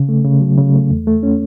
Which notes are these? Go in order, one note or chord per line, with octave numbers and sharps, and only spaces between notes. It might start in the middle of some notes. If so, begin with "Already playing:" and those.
Already playing: C#3
A3
C#3
F#3
C#3
A3
E2
A3
C#4